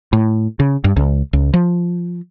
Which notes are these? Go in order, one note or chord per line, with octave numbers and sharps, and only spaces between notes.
A2
C#3
G2
C#2
C#2
F3